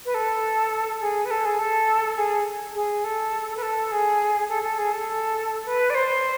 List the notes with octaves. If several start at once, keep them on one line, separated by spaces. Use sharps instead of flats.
B4
A4
G#4
B4
A4
G#4
A4
G#4
G#4
A4
B4
A4
G#4
A4
A4
G#4
A4
B4
D5
C5